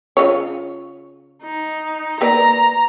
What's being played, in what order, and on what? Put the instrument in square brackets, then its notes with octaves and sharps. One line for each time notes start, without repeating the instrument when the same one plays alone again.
[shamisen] C#3 F4 C#5
[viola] D#4
[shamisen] A#3 B4 D5 [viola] A#5